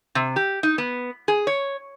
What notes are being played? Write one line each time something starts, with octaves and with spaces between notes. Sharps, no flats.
C3
G4
D#4
B3
G#4
C#5